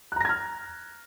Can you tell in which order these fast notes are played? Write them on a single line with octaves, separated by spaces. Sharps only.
F#6 A#5 A#6 G#6 F6